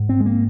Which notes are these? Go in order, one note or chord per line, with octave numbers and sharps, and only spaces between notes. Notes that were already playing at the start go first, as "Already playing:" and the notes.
Already playing: G#2
C4
G#3
A#3